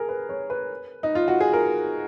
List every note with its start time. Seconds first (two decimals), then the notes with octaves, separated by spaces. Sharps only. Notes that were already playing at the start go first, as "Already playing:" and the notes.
Already playing: G#4 A#4
0.09 B4
0.29 C#5
0.50 B4
1.03 D#4
1.15 F4
1.28 F#4
1.41 G#4
1.53 A#4